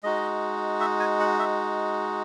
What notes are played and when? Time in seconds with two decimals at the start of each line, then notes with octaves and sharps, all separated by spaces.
0.03 G#3 D#4 F#4 D#5
0.80 E5
1.00 G#5
1.20 F#5
1.39 E5